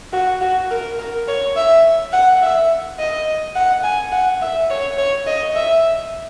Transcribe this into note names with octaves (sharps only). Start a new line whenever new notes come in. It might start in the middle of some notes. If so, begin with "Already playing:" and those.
F#4
F#4
A#4
A#4
C#5
E5
F#5
E5
D#5
F#5
G#5
F#5
E5
C#5
C#5
D#5
E5